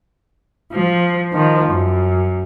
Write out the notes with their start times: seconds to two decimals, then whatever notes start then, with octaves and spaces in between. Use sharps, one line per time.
0.72 F3
1.33 D#3 F3
1.70 F#2